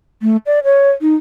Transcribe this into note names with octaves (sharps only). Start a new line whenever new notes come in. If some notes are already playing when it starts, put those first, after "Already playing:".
A3
D5
C#5
D#4